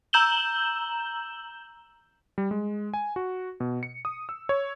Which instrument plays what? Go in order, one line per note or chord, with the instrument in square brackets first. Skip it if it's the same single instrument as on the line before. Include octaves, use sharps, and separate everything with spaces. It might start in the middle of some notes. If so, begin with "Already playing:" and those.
[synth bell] A#5 E6 G6 E7 F#7 G7
[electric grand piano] G3
G#3
G#5
F#4
B2
C#7
D#6
E6
C#5